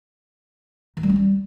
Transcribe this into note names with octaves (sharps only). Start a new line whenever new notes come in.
D#3
G3
C#4
G3